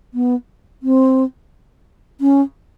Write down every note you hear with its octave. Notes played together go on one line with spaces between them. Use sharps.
B3
C4
C#4